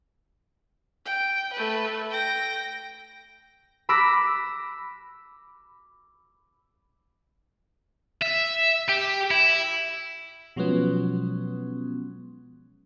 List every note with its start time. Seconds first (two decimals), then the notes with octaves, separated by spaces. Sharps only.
1.06 G5
1.53 A3 B4
2.11 G5 A#6
3.89 B5 D6 E6 F#6 A#6 B6
8.22 E5
8.89 G4
9.31 E4
10.56 B2 F3 F#3 G#3 B3 C#4